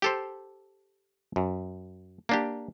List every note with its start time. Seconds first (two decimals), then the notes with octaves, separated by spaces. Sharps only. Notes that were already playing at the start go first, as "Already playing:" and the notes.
0.02 G4 A4 C5
1.36 F#2
2.29 A#3 D4 G4